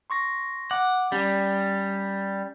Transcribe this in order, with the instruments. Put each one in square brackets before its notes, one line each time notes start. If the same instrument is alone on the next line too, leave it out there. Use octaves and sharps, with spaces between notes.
[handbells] C6 C#6 A#6
[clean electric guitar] F#5 [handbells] D6
[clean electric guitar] G3 [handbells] C#4 G4